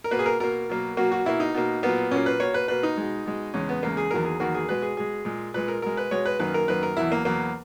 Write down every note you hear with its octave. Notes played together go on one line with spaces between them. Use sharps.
A#4
B2 A#3 B4
G#4
A#4
B2 A#3 A#4
B2 F#3 A#3
B2 F#3 A#3 F#4
F#4
B2 A#3 E4
D#4
B2 A#3
A#2 F#3 A#3 B3
A#2 F#3 A#3 C#4
B4
B2 A#3 C#5
B4
B2 A#3 B4
D#4
B2 G#3
B2 G#3
E2 C#3 G#3 C#4
B3
E2 C#3 G#3 A#3
G#4
E2 D#3 F#3 A#3 A#4
G#4
E2 D#3 F#3 A#3 F#4
G#4
B2 G#3 B4
G#4
B2 G#3 G#4
A#2 G#3
A#2 G#3 B4
A#4
B2 G#3 A#4
B4
B2 G#3 C#5
B4
F#2 D#3 A#3 B4
A#4
F#2 D#3 A#3 B4
A#4
E2 B2 F#3 E4
A#3
E2 B2 F#3 A#3